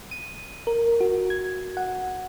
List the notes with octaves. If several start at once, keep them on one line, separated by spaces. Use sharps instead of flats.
D#7
A#4
F#4
G#6
F#5